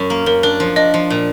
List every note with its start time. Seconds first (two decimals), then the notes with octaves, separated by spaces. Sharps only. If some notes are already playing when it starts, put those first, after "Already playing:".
Already playing: F#2
0.10 A#3
0.26 F#2 A#4
0.43 D4 A#4
0.60 F3
0.76 D4 D#5
0.94 F3
1.10 A#2